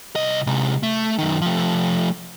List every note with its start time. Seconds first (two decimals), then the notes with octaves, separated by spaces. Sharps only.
0.16 C2 D#5
0.47 C3 G#3
0.83 A3
1.18 F#2 D#3
1.42 F3 A3